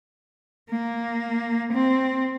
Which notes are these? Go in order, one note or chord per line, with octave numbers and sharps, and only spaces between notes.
A#3
C4